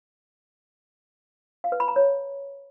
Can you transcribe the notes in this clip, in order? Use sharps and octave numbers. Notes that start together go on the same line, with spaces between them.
F5
B4
B5
A#5
C#5